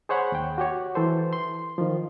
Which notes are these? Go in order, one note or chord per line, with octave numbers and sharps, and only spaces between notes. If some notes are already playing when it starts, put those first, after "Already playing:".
G#4 C5 C#5 F#5 B5
D#2 G5
F#4 G4 C#5
E3 A4 C5
C6
D#3 F3